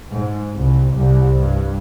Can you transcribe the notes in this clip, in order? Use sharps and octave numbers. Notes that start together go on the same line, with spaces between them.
G#2
C2
C2
G2